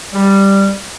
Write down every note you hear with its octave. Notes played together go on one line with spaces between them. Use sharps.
G3